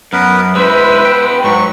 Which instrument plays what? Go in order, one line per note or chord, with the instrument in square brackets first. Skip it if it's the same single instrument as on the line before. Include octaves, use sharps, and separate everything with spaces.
[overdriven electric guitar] F#2 [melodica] B3 A#4 B4
[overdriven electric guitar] G#3 E4 [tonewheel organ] B4 [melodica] C5 E6
[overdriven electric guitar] B3 G5
[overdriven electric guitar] G#2 [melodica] F#3 C#6